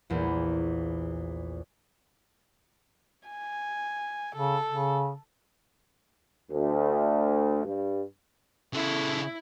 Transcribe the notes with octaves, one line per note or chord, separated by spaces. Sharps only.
A#1 E2 A#2
G#5
C#3 A4
C#3
D2
G2
C#3 E4 A4